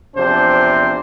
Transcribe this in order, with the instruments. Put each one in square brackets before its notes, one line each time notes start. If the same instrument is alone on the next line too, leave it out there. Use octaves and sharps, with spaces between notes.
[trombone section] E2 C3 F3 D4 C5